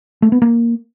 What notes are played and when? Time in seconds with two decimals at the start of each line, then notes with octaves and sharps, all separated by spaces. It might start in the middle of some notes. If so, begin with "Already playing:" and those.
0.22 A3
0.32 B3
0.42 A#3